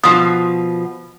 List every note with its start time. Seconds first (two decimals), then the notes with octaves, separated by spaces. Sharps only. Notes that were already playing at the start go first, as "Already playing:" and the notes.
0.04 B2 F3 D#6